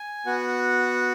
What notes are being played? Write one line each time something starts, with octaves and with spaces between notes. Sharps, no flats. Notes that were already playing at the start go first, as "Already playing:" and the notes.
Already playing: G#5
B3 F#4 F#5